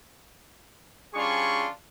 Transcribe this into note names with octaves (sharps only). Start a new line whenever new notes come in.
G3 C#4 D4 F4 G#4 C#6